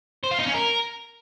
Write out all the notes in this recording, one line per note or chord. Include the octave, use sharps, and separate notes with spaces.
C5
F4
D#4
C#4
A#4